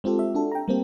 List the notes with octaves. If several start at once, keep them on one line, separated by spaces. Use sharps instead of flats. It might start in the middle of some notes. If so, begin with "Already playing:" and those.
G#3 C4 F4 G4 A4
E5
D4 F#4 A4
G5 A#5
G3 A#3 C4 G4